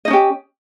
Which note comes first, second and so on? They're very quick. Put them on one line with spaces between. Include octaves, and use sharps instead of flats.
D#5 D#4 C#4 G4